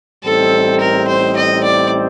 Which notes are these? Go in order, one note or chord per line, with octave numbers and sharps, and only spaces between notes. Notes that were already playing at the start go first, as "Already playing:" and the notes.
A1 A2 G3 C4 D#4 A4
A#4
C5
D#5
D5